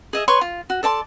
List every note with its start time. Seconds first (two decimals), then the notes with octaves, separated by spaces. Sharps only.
0.13 G#4 D#5 E5
0.28 B4 C#5 C6 C#6
0.41 F4
0.70 F#4
0.83 A4 D5 A5 C6